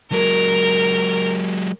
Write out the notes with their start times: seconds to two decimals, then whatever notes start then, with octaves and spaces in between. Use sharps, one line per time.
0.12 F#3 G#3 A#4